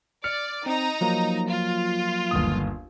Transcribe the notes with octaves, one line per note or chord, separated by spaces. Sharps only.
D5 F6 C#7
C4 D#4 A#5
F3 F#3 A#3
F4
G1 D#2 D#6